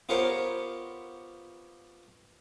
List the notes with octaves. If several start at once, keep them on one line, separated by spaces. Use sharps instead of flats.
B3 F4 G4 A#4 C5 C#5